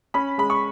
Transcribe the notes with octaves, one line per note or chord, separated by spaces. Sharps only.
C#4 B5
G#3 B5
C#6